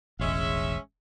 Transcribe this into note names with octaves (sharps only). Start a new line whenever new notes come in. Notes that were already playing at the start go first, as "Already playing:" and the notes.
E1 A1 G#3 C#4 E5